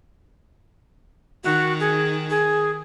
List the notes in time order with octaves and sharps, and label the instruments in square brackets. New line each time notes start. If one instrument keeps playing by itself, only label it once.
[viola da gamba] D#3 [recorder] F#4
[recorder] G#4
G#4